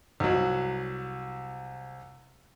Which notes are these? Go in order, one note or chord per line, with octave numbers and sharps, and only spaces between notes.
C2 F#3